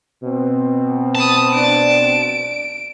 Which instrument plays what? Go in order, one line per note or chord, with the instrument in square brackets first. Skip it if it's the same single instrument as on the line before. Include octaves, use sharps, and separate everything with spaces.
[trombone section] B2 C4
[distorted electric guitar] A5 [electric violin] B5 D#6
[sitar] D4 B4 [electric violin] D7